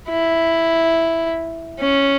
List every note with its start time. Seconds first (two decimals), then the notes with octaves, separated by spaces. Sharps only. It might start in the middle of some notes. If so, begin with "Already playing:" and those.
0.09 E4
1.80 C#4